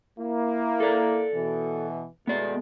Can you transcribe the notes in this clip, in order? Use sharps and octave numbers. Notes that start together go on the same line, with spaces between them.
A#3 E4
A4 D5
B2 E3
B2 G#3 A3 B3 D5